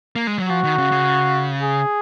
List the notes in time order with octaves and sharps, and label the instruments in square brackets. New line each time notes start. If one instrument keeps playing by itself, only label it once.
[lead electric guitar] A#3
G#3
F#3
[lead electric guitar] F3 [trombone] F#4
[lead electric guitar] D#3
C#3
C#3
[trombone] G#4